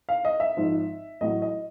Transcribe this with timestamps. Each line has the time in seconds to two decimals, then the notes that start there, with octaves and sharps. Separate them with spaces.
0.09 F5
0.25 D#5
0.40 E5
0.57 G#1 G#2 F3
1.21 A1 A2 F#3 D#5
1.42 D#5